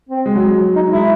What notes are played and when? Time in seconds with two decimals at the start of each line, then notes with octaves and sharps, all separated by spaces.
0.09 C4
0.26 G#3
0.35 F#3
0.44 G#3
0.76 D#4
0.92 G#3 E4